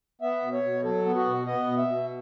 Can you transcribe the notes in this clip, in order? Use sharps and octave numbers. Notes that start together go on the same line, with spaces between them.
B3 E5
B2
C#5
B2
F#3 A4
B3
F#4
B2
B3 D#5
B2
E5
B2